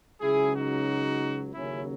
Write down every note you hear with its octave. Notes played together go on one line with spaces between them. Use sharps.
C#2 C#3 F#3 E4 G#4
D#4 F#4
D#2 C#3 F#3 C#4 E4